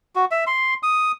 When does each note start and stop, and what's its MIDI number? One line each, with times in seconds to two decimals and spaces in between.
0.15 0.25 66
0.31 0.44 76
0.47 0.74 84
0.83 1.12 87